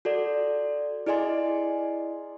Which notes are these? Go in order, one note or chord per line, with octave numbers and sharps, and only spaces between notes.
F#4 A4 D5
E4 G#4 D5 D#5 G#5 C6